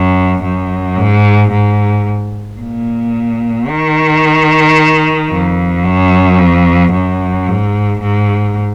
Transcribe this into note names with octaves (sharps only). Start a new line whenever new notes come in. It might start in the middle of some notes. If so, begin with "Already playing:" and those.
Already playing: F#2
F#2
G#2
G#2
A#2
D#3
F2
F#2
F2
F#2
G#2
G#2